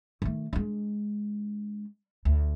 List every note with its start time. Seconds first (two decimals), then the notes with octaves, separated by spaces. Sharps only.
0.22 D#3 A3
0.53 G#3 D4
2.25 D2